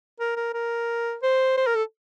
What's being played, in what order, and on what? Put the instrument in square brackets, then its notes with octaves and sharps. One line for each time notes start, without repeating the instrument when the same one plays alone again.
[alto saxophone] A#4
A#4
A#4
C5
C5
A#4
A4